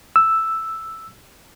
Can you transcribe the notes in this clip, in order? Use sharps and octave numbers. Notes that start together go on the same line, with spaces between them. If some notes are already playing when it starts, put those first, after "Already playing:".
E6